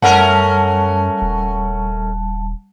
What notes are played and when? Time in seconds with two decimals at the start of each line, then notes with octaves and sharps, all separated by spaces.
0.02 F#2 G3 A3 C#4 A#4 F#5 A5
1.22 D#1